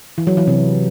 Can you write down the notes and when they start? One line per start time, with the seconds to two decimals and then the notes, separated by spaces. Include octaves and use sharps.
0.18 E3
0.27 F#3
0.37 E3
0.47 C3